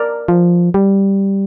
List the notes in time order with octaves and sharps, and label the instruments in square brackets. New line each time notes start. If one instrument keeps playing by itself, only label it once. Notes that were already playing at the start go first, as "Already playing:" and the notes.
Already playing: [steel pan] A#4 D5
[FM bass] F3
G3